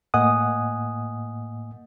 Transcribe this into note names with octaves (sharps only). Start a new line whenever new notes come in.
A2 A#3 D#5 F#5 G#5 D#6